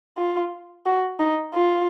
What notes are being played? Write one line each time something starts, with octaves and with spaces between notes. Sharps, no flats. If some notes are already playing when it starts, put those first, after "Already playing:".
F4
F#4
D#4
F4